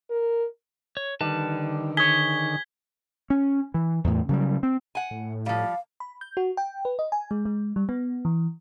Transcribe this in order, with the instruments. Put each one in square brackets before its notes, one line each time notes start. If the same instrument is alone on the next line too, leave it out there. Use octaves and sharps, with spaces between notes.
[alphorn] A#4
[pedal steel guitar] C#5
[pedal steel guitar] D3 B4 A5 [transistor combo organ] D#3 [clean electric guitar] G3
[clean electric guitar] G#4 C#5 [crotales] G#6 B6 G7
[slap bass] C#4
E3
E2 A2
C#3 F#3 G3
C4
[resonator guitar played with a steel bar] F#5 G#5
[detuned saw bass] A2
[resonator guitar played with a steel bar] F3 G3 [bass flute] F5
[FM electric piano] B5
G6
F#4
G5
B4
D#5
G#5
G#3
G#3
G3
B3
E3